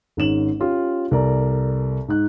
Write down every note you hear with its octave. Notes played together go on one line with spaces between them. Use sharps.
G#1 G#2 C#4 E7 F#7
C#4 F4 G4
C2 A4 A#4 D5 A#5
G#2 D#4 F#6